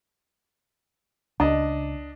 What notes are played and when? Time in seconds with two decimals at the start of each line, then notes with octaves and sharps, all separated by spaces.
1.40 C#2 D4 D#5